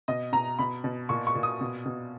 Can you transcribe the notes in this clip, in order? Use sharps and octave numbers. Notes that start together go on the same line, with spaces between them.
B2 D#5
B2 A#5
B2 B5
B2
A#2 C#6
C#6
A#2
D#6
B2
B2